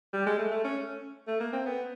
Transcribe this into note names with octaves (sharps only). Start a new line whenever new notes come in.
G3
G#3
A3
A3
C#4
A3
A#3
C4
B3